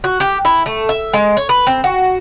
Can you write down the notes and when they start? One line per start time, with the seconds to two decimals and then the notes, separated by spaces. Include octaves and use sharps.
0.04 F#4
0.20 G4
0.45 E4
0.66 A3
0.89 E5
1.13 G#3
1.37 C#5
1.49 B4
1.67 C4
1.84 F#4